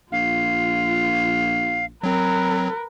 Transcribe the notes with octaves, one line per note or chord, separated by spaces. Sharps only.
A#1 F4 F5
F#3 C4 A#4 B4